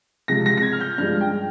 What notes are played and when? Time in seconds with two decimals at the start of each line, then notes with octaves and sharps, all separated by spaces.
0.28 C3 F3 G#3 A#6
0.46 A#6
0.57 A#6
0.63 G#6
0.73 F6
0.81 G6
0.98 G2 F3 G#3 F6
1.21 G5